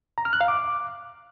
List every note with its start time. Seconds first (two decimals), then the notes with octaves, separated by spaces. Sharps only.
0.18 A#5
0.25 F6
0.33 F#6
0.41 F5
0.48 D6